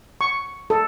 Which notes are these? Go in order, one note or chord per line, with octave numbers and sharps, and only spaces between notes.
C#6
A4